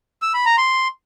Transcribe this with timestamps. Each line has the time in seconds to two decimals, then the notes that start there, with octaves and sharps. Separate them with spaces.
0.22 E6
0.34 B5
0.46 A#5
0.58 C6